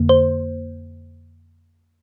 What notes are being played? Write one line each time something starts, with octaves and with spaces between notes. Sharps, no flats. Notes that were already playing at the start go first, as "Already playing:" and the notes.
Already playing: F2 D3 A#3
C5